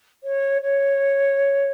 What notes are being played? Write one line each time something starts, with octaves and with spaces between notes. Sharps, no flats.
C#5
C#5